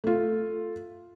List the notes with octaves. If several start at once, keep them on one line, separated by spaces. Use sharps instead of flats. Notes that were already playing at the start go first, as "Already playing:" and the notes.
A3 F4